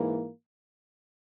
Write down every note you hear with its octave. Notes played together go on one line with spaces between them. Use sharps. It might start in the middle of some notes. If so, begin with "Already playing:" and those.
Already playing: G#2 E3 A#3